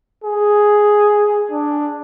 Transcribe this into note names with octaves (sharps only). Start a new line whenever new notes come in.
G#4
D4